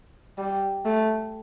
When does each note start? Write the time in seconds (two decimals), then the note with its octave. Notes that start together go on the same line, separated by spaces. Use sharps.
0.38 G3
0.86 A3